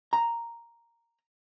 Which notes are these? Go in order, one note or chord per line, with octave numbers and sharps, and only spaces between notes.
A#5